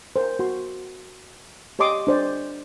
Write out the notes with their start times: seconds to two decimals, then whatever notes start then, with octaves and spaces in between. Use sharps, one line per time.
0.16 A#4 C5
0.39 F#4 C6
1.79 G4 C#5 D#5 C6 D6 D#6
2.07 D4 C5 D5